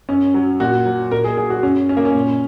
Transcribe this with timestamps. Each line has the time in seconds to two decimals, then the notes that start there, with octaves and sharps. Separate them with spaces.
0.09 F#2 C#4
0.34 F#3
0.60 A#2 F#4
0.86 F#3
1.11 A#2 A#4
1.24 G#4
1.37 F#3 G#4
1.50 F#4
1.63 F#2 C#4
1.89 C#3 C#4
1.97 A#3
2.05 C#4
2.14 A#2